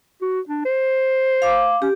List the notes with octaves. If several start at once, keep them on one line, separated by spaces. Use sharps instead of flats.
F#4
D4
C5
F5 D6
C#4 G4